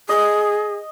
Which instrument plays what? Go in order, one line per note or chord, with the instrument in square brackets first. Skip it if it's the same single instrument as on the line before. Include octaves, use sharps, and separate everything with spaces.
[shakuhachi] G#4 [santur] D#5